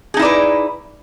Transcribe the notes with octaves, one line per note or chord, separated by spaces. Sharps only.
D#4 E4 G#4 B4 D5